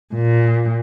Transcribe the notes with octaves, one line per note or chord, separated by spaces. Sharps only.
A#2